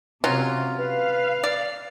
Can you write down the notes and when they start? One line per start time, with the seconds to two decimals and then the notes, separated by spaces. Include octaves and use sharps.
0.24 C3 F#3 C#4 F4
0.79 B4 F5
1.43 D5